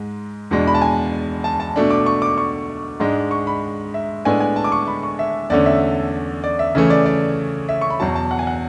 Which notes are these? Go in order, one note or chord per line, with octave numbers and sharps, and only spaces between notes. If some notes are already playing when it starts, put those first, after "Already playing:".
Already playing: G#2 G#3
E2 B2 G#3 D4
B5
A5
G#5
A5
A5
B2 A3 D4
D6
C#6
D6
C#6
G#2 G#3 D4
C#6
B5
E5
A2 G#3 B3 D4 G#5
G#5
A5
D6
C#6
B5
C#6
E5
E2 D3 A3 C#4 D5
E5
D5
E5
C#3 E3 A3 C#4 E5
D5
D5
E5
C#6
B5
E2 B2 F#3 A5
A5
F#5
G#5
F#5